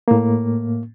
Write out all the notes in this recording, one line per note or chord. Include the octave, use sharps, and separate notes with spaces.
A2 A#3